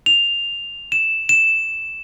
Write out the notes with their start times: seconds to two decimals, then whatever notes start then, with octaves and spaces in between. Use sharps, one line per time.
0.06 F7
0.92 E7
1.29 E7